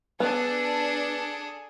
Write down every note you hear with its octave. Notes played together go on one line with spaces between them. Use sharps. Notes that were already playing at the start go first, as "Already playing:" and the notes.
B3 D4 G#4 A4